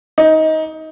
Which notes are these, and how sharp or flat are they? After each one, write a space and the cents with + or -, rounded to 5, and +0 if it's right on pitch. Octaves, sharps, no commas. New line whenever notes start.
D#4 +20